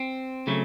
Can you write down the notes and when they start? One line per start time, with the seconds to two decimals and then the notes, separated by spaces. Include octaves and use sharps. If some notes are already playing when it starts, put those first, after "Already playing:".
Already playing: C4
0.47 C#3 F#3 A3